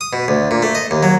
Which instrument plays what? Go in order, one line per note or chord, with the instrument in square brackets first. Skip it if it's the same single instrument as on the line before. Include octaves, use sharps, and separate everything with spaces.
[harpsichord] D#6
B2
D2
A#2
A3
D#5
D#2
F#3